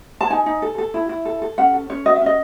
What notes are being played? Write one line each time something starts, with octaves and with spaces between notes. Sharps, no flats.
A5
D#4 G#5
D#4
A4
A4
E4
E4
A4
A4
C#4 F#5
A4
C#4 C#5
F#4 D#5
E5
C#4 D#5